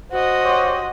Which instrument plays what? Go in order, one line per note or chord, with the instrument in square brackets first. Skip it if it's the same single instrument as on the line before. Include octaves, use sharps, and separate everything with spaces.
[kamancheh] F#4 D#5 [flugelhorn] C5
[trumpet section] G4 C#5 C6